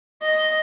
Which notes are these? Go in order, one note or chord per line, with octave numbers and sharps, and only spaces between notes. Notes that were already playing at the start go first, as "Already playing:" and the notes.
D#5